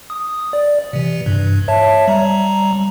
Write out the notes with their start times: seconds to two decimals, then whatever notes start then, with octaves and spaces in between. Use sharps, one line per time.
0.10 D#6
0.53 D5
0.93 C3 E3
1.26 G2
1.68 C#5 E5 A5
2.08 G3 A#5